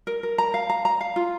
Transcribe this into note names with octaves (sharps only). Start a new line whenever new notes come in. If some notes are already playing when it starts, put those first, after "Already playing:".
A#4
A#4
A#5
F5
A#5
A#5
F5
F4